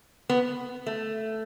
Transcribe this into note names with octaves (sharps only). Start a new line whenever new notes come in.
B3
A3